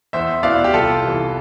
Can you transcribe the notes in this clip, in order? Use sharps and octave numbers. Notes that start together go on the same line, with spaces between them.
E2 C5 E5
B2 B3 E4 D5 F5
G4
C2 F4 A4
C3 E3